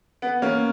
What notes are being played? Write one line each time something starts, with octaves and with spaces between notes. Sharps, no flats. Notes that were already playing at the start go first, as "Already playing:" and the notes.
B3
A#3 C#4